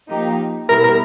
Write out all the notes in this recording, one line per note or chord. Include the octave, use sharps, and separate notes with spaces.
F3 A#3 D#4 G4
B2 G3 B3 E4 A#4
A#4